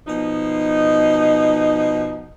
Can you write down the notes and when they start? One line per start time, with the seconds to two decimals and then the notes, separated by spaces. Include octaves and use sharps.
0.07 B2 F3 D#4